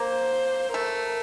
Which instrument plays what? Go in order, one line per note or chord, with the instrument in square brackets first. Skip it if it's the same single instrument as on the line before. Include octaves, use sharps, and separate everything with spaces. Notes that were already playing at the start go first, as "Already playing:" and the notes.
Already playing: [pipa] A#3 [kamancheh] C5
[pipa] A3 [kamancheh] A#4